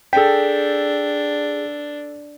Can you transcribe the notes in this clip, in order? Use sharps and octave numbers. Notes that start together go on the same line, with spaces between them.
D4 G#4 A4 G5 B6